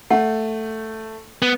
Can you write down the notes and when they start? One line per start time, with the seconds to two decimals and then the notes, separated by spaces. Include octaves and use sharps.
0.10 A3 F#5
1.42 B3